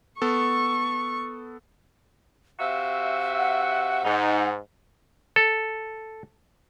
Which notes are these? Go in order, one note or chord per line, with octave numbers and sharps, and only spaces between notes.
B3 A4 C#6
C3 F#4 E5 F5
F#5
G#2 D#4
A4